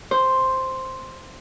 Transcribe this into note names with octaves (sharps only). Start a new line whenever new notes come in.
C5